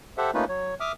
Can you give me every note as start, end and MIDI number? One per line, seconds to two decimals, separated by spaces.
0.18 0.31 67
0.18 0.31 69
0.18 0.31 72
0.18 0.31 76
0.18 0.31 78
0.34 0.45 57
0.34 0.45 58
0.34 0.45 61
0.34 0.45 63
0.34 0.45 65
0.34 0.45 71
0.49 0.74 54
0.49 0.74 73
0.80 0.92 76
0.80 0.92 86
0.80 0.92 87
0.80 0.92 89